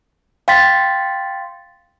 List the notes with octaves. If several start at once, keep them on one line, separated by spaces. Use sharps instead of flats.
F5 G5 C6 A6 B6